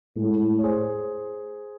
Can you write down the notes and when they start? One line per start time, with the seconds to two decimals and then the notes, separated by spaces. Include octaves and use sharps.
0.16 A2 G#3
0.58 C#5
0.63 G#4 C5